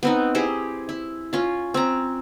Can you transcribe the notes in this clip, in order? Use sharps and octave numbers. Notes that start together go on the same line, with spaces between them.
B3 C4 D#4
E4 G4 G#4 C5
E4
C#4 F4
C4 C#4 A#5